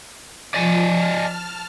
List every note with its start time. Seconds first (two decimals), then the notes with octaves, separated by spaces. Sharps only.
0.54 F3 D5 D#5 G#5
0.91 A5 F6